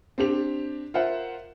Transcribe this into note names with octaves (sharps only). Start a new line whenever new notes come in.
C4 D4 G4 F7
F4 A#4 C5 E5 F#5